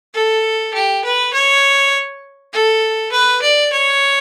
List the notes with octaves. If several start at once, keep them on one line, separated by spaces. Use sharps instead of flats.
A4
G4
B4
C#5
A4
B4
D5
C#5